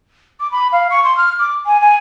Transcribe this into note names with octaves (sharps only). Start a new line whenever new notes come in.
D6
B5
F5
C#6
C6
F6
D6
G#5
G#5